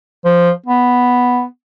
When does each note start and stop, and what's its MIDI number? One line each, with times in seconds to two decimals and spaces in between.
0.25 0.50 53
0.66 1.44 59